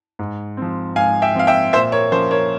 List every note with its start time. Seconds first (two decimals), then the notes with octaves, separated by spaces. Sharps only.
0.19 G#2
0.57 F3 C4
0.96 G#2 F5 G#5
1.22 E5 G5
1.35 F3 C4 F5
1.47 E5 G5
1.73 A#2 C5 E5
1.92 A#4 C#5
2.12 F3 A#3 C#4 C5
2.31 A#4 C#5